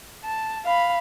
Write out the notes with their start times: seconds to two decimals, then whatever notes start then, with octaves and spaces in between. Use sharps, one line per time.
0.24 A5
0.65 F5 B5